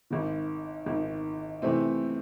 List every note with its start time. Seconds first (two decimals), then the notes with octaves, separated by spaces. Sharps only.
0.10 G#1 G#2 D#3
0.86 G#1 G#2 D#3
1.62 C3 E3 A3 C4